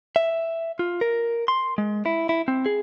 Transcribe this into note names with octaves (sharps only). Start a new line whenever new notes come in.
E5
F4
A#4
C6
G#3
E4
E4
C4
G#4